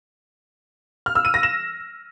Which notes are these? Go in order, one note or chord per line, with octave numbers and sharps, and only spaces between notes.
F6
E6
D#7
A#6
E7